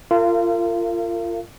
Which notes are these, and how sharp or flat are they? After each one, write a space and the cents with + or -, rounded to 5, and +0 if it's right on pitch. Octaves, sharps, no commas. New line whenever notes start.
F4 -20 A#4 -40 F5 -40